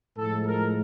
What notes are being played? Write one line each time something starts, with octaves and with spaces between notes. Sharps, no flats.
A2 F3 G#3 A4
A#4